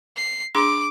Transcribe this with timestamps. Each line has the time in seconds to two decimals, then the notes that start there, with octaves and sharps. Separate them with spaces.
0.17 C7
0.55 D4 G#4 C6 D6